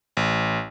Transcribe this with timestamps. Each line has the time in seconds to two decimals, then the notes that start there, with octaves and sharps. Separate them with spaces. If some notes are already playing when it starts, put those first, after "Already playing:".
0.17 A1